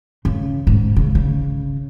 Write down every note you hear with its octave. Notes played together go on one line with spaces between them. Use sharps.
C#3
G#2
C#3
C#3